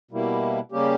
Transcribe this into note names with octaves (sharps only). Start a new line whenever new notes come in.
B2 G3 A#3 E4
C#3 G3 A#3 C#4 G4